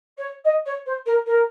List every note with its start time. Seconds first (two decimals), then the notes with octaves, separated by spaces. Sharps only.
0.17 C#5
0.45 D#5
0.65 C#5
0.86 C5
1.06 A#4
1.26 A#4